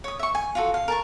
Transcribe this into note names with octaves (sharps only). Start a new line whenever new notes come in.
C#5 D#6
E5 C#6
G#5
F4 F#4 A4
F5
A#4 A5 C#6